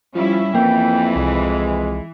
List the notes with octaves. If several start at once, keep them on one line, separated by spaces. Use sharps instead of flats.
F3 G3 C#4 E4
F2 E3 A#3 G5
C2 G#3